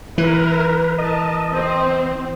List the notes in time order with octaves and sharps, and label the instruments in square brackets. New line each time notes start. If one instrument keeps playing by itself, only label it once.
[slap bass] E3 [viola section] E4 A#4 [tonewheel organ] B4
[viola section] A#4 A5 [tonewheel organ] D#5
[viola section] C4 C5